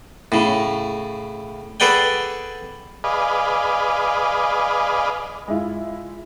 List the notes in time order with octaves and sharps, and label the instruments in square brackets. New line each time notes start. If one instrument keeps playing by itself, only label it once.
[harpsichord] A2 C#3
G#4 A4 B4 D5 F#5 G5
[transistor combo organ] G#4 B4 D5 D#5 F5
[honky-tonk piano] G#3 E4 F4